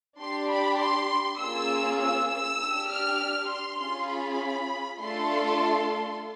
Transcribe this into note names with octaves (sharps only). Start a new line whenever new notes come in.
D4 G4 C6
B5
C6
A#3 C#4 F4 G#4 E6
E6
E6
D4 G4
F6
C6
C#4 F4 G#4 C6
B5
A3 D4 F4 A4 C6